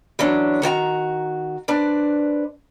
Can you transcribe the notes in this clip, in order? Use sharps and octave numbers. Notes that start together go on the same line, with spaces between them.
E3 F#3 C#4 D4
D#3 F#4 F#5 A#5
D4 B4 C5 D5